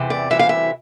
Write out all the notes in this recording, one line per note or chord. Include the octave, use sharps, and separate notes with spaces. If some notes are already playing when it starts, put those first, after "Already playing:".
Already playing: E2 C3 E3
D5
D2 C3 E3 G3 E5
F5
E5